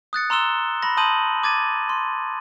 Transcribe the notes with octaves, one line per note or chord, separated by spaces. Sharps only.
D#6 F#6 A6 C#7
A#5 C6 E6 E7 G7
B5 A#6
A5 C6 D#6 G6 D#7 F#7
D6 G#6 A6 D#7
C6